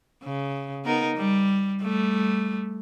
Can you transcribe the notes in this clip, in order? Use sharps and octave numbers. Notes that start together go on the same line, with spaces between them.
C#3
B3 D#4 A#4
G3
G3 A3